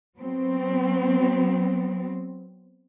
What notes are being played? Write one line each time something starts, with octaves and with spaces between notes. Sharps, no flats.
F#3 B3 C4